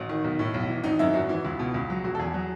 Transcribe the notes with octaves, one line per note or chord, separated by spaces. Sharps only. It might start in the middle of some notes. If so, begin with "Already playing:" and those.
Already playing: A1 F#4
D#3
B1
A2
B1
E3
G#1 D#4
F#2 E4
G#1 F#4
E3
C#2
B2
C#2
F#3
E1 F#4
A4
E2 G#4
F#3